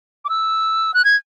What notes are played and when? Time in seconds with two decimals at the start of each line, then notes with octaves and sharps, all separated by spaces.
0.25 D6
0.29 E6
0.94 F#6
1.04 G#6